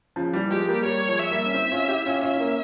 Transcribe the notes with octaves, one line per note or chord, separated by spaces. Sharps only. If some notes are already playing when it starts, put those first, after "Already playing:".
C#3 F3
E3 G3
F3 G#3 G4
G3 A#3
G3 A#3 C#5
F3 G#3
E5
G3 A#3
C#4
C4 E4 E5
C#4 F4
E4 G4
C#4 F4
C#4 F4 E5
E4
A#3 C#4